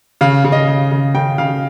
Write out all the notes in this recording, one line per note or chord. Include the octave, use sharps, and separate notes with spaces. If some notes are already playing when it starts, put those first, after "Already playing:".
C#3 F5
C#3
D#5
C#3
C#3
C#3 G5
C#3 F5